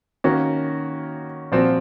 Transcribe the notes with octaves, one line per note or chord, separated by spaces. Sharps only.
D#3 A#3 C#4 F#4
A#2 F3 C4 F#4